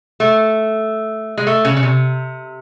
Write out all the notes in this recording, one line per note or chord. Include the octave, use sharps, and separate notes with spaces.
A3
G#3
A3
C#3
C#3
C3